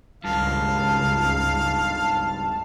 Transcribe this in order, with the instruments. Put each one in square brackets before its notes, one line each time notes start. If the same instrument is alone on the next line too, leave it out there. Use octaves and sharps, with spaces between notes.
[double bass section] C#2 [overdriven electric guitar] G2 D#3 [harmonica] F5 [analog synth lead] A5